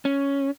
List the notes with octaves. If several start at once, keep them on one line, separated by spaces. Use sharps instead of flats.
C#4